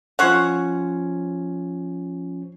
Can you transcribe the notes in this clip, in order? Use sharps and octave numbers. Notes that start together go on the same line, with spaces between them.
F3 C#4 C5 C#5 F#5